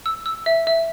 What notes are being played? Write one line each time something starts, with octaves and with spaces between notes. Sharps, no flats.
E6
E6
E5
E5